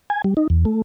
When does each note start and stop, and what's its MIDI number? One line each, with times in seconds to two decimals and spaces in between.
0.10 0.22 80
0.24 0.34 55
0.37 0.47 63
0.50 0.65 40
0.65 0.82 57